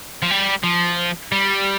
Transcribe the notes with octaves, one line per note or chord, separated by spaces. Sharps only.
F3
G3
F3
G3